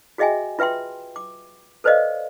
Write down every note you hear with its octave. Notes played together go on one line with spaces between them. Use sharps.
F#4 G#4 D#5 E5 G5 G#5
F4 B4 E5 G5 C6
D6
A4 B4 C5 D5 D#5 F5